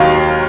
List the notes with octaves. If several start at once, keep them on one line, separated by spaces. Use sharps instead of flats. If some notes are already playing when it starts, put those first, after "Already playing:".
Already playing: D#2 D#3 F#3 F5